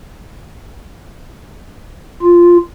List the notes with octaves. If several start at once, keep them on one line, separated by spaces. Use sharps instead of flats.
F4